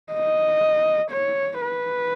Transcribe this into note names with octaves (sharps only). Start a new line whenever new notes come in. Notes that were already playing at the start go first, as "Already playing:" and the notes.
D#5
C#5
B4